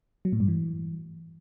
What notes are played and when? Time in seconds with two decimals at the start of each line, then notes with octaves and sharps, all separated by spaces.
0.25 F#3
0.33 A2
0.40 G2
0.48 E3